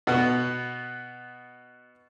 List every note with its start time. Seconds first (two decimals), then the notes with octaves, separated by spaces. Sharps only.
0.07 B2 B3